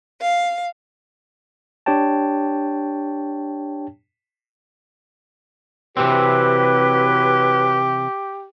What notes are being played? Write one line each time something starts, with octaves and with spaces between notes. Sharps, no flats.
F5
D4 G4 C#5 G5 A5
C3 E3 F#3 C4 E4 G4 B4